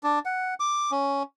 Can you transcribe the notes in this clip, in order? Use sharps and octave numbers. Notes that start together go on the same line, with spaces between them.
D4
F#5
D6
C#4